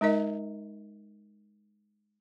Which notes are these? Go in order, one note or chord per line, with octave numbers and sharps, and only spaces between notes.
G#3 D#4 A#4 D#5